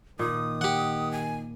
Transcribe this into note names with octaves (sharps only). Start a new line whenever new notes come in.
A#2 D#3 D#6
G4 F#5
G#5